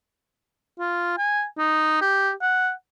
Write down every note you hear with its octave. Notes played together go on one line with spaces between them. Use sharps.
F4
G#5
D#4
G4
F#5